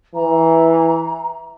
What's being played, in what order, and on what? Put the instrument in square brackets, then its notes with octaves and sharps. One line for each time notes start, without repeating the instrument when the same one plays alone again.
[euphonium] E3 [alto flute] A#5